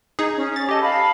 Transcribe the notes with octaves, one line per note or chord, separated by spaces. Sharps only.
D#4 G#4
C#4
A6
G4 A4 D#5
F5 A5 B5